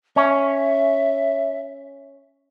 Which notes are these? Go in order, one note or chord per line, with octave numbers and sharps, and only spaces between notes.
C#4 E5